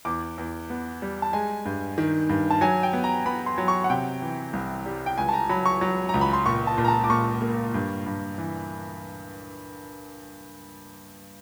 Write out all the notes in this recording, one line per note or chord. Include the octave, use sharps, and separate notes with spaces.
E2 D6
E2
B3
G3
A5
G#3 G#5
G2
D#3
G2
A5
F#3 G#5
G5
B3
A#5
B3 B5
C6
F#3
C#6
F#5
C3 G5
E3
C2
G3
G5
C#2 G#5
A5
A#5
F#3 B5
C#6
F#3
C#2 A#5
B5
C6
A#2 C#6
A5
A#2
A#5
A5
D6
A#2 C#6
A#3
G2
G2
E3